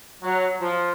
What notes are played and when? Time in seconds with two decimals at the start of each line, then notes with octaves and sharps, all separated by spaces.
0.23 F#3
0.61 F3